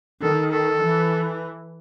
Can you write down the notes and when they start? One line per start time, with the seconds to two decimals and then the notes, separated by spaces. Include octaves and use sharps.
0.22 D#3 A4
0.52 A4
0.83 E3